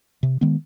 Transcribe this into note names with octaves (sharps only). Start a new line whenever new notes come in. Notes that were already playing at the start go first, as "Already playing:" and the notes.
C3
D#3 G#3 B3